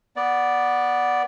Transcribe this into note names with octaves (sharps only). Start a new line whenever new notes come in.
B3 D5